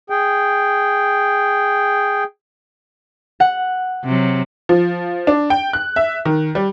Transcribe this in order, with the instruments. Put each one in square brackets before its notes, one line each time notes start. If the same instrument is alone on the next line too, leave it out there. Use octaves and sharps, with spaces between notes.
[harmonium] G#4 G5
[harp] F#5
[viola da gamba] C3 F#3
[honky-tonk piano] F3
D4
G5
F#6
E5
D#3
G3